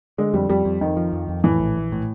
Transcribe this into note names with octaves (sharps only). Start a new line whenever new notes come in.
D3 G#3
F2 G3
F2 G3
F2
F2 D#3
F3
F2
F2
A2 E3
A#1
A#1
A2